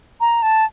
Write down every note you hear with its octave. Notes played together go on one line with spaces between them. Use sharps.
A#5
A5